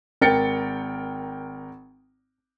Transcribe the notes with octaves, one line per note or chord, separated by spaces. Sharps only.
G#1 A#4 G5 A6 C#7